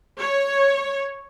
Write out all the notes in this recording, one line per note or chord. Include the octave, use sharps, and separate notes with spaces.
C#5